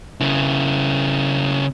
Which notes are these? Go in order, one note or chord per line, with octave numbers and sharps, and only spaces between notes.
C#3 E4